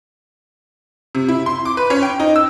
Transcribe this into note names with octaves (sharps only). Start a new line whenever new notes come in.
C3
E4
C6
D6
B4
C#4
G5
D#4
E6